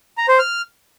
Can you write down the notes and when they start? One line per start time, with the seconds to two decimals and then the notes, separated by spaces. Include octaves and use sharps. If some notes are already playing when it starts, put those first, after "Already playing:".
0.18 A#5
0.28 C5
0.39 F6